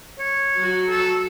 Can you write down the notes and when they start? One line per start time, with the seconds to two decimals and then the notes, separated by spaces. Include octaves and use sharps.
0.19 C#5
0.57 F#3 F#4
0.89 A4